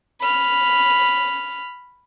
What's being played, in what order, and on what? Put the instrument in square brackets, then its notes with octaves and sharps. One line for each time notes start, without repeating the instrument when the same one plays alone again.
[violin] B5 F6